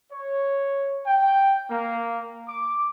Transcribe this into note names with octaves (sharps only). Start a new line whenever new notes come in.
C#5
G5
A#3
D6